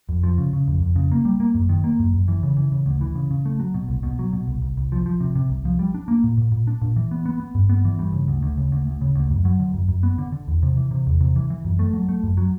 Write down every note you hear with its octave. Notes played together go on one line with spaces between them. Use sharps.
F2
F3
C#3
C#3
F2
F2
C#3
A#3
G3
A#3
F#2
D#3
A#3
F#2
F#2
E3
C#3
E3
C#3
D2
E3
C#3
C#3
A3
F#3
B2
C2
B2
F#3
B2
C2
C2
C2
F3
F3
C3
C3
C2
F3
G3
D4
A#3
A#2
A#2
A#2
D4
A#2
E3
B3
B3
B3
G2
B3
E3
G2
C#3
D2
D2
C#3
D2
D2
C#3
D2
F#2
F#3
D3
F#2
F#2
B3
D3
D3
E2
C3
E3
C3
E2
C3
E3
E3
F#2
A3
F#3
A3
F#2
F#3